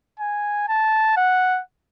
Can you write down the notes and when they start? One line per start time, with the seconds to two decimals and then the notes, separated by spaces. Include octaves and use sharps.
0.20 G#5
0.68 A5
1.17 F#5